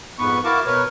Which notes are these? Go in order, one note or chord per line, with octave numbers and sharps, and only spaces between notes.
F2 G#2 B3 B4 C#6
E4 F#4 A#4 F5 A5 D6
B2 A#4 B4 C#5